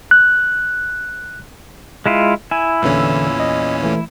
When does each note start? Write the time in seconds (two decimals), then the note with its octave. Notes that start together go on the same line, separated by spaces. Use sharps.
0.11 F#6
2.06 G#3 E4 F4
2.51 E4 G#5
2.82 E2 A#2 D3 E3 C#4 E6
3.40 D#5
3.83 E3 A3